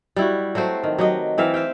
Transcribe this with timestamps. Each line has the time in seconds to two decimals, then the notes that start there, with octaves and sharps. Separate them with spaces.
0.16 G3 E4 F#4
0.55 F#3 A3 C4 C5
0.83 D#3
0.99 F#3 G4 D#5
1.38 E3 C4 E5 F5
1.54 C5 E5 F5 G5